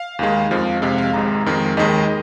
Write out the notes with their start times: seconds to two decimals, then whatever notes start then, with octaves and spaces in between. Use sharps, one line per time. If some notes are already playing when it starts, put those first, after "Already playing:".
Already playing: F5
0.19 D#2 D#3 G#3
0.51 F2 F3 G#3
0.82 F2 C3 G#3 F5
0.98 F5
1.13 G#1 G#2 G#3 A#5
1.46 F2 D#3 G#3
1.77 D#2 D#3 G#3 D#5